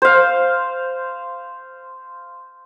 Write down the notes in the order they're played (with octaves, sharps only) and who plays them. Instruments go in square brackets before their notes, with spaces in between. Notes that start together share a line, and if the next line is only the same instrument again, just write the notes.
[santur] C5 F5